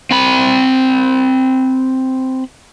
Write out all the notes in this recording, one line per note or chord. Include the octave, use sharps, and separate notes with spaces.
C4 B5